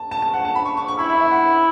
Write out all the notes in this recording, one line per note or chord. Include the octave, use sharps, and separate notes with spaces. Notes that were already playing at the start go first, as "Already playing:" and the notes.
Already playing: A5
A5
A5
F#5
A5
B5
C#6
C#6
C#6
E4 B5
E5
E5
F#5